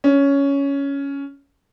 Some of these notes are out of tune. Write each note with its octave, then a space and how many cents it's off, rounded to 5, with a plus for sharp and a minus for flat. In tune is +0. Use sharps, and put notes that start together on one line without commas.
C#4 +10